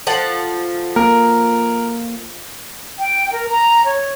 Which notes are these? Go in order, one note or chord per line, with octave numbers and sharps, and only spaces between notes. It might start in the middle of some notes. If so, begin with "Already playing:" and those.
F3 A4 F#5
A#3 A#4
G5
A#4
A#5
C#5